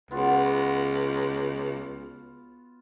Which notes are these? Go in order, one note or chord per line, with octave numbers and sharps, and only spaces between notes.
C#2 B3 F4 F#4